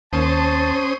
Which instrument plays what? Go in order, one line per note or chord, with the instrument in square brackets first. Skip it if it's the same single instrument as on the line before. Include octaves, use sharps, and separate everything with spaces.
[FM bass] D#2 [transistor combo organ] C#4 C5 D#6 [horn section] A5